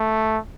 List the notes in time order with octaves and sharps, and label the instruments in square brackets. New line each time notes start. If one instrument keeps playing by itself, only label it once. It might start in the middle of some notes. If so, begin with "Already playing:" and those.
Already playing: [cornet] A3